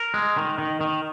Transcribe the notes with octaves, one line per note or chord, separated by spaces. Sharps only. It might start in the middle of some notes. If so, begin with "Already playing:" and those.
Already playing: A#4
G#3
D#3
D#3
D#3